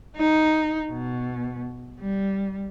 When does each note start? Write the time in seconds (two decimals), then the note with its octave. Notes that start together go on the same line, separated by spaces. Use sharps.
0.17 D#4
0.91 B2
2.00 G3